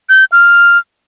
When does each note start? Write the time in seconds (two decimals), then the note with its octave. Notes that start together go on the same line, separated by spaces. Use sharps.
0.09 G6
0.32 F6